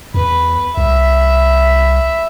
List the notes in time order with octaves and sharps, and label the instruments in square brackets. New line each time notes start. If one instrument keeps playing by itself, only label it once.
[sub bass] E2 [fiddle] B4
[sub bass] C2 [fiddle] E5 B5